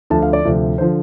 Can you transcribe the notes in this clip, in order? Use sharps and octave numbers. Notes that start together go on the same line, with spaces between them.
D2 D3 F3 A5
F5
D5
D2 C3 F3
D3 F3 C5